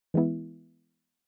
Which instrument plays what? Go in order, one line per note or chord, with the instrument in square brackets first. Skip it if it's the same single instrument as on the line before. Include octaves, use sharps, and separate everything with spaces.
[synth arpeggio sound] E3 G#3 B3 E4